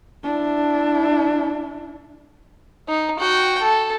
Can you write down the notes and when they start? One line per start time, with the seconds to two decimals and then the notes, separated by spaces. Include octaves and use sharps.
0.23 D4 E4
2.88 D#4
3.19 F#4 G5
3.61 A4